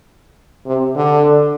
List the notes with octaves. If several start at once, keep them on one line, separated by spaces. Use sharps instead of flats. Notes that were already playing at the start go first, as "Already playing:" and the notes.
C3
D3